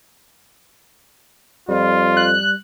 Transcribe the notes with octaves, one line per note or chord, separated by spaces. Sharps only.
F2 G3 F4
F#6